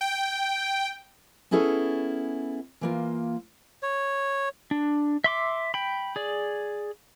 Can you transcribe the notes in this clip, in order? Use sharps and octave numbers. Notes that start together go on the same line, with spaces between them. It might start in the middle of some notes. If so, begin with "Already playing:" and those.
G5
B3 C#4 E4 G#4 A4 C#5
E3 A#3 F4
C#5
D4
E5 C6 D6
G5 B5
G#4 D5